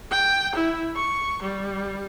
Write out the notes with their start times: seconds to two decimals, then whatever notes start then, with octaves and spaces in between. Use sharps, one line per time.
0.11 G5
0.55 E4
0.96 C#6
1.42 G3